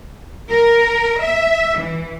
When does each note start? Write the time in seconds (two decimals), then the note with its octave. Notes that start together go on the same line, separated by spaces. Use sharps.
0.51 A#4
1.21 E5
1.79 E3